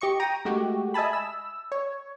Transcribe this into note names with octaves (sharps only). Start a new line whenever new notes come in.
G4 D#5 C#6 C#7
G5 A#5 A#6 D#7
G#3 A3 F#4 G4
D#5 E5 G#5 A5 B5
E6
C#5